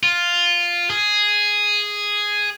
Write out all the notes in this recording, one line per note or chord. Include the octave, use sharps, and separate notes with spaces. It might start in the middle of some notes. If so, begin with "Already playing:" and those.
F4
G#4